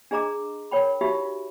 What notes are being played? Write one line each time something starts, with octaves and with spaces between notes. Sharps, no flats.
D4 G#4 D#5 A#5 D6
A#4 C#5 G5 B5
D#4 E4 F#4 G4 E5 B5